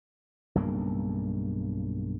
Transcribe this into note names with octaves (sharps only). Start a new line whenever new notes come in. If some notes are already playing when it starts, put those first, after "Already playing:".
B1 G2 C#3 A#3